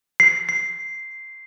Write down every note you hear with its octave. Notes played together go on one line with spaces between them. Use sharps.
C7
C7